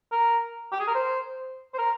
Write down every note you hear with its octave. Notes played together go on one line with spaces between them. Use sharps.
A#4
G4
G#4
A#4
C5
C5
A#4